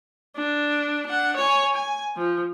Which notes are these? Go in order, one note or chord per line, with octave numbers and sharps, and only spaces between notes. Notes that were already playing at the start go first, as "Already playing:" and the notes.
D4
D4 F#5
C#5 G#5
G#5
F3